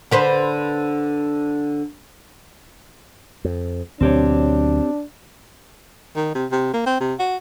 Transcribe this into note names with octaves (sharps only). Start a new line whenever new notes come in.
D3 B4 C5
F2
D2 B2 F#3 C4 D4 G4 C#5
D#3
C3
C3
A#3
C4
C3
F#4